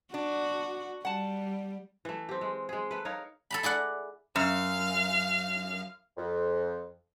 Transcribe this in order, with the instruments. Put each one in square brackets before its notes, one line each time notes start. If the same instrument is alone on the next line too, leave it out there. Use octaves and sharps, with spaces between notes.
[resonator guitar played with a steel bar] D4 [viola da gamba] F#4
[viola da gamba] G3 [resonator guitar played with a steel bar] F#5 A5
[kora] E3 A3
C4 G4
G#3
G#3 G#4
A3 B4
D#4 A#4 C#5 F5
[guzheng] A4 A#5 B5
E4 G#4 D5 F#5
[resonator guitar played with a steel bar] F#2 [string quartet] F5
[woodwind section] F2